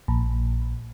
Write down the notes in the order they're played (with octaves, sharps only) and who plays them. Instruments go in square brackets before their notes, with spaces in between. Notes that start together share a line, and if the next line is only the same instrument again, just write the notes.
[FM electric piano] A#1